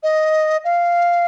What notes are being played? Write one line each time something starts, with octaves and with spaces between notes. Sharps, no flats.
D#5
F5